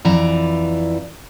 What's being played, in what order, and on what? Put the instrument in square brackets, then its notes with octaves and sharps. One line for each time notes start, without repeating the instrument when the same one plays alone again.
[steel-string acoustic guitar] F2 E3 D5 A#5